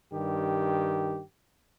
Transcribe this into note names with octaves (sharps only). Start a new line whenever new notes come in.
G2 D#3 G4